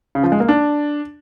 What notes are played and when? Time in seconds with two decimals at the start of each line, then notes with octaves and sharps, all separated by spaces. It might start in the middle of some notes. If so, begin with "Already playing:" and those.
0.15 C#3
0.23 F3
0.32 G#3
0.40 A#3
0.48 D4